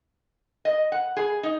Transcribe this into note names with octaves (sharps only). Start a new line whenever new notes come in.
D#5
F#5
G#4
D#4